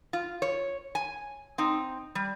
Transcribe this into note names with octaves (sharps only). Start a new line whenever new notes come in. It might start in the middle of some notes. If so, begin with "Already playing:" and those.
F4
C#5
G#5
C4 D#4
G3